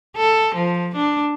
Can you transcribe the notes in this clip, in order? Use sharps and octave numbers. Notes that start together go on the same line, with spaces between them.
A4
F3
D4